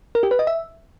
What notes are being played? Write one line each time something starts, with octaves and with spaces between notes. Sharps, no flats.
A#4
G4
B4
D#5
E5